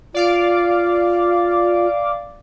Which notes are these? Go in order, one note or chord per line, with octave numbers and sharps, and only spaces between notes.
F4 D5 F5 D6